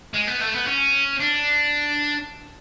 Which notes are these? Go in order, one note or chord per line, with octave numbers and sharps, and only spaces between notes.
G#3
B3
A3
B3
C#4
D4